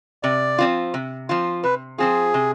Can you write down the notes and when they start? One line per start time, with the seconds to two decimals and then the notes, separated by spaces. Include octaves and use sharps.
0.23 C3 D5
0.58 F3 C4 F4
0.94 C3
1.29 F3 C4 F4
1.64 C3 B4
1.98 F3 C4 F4 G#4
2.34 C3